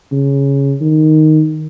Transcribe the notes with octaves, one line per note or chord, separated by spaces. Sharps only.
C#3
D#3